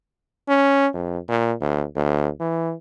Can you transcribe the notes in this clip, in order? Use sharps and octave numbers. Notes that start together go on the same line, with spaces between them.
C#4
F2
A#2
D2
D2
E3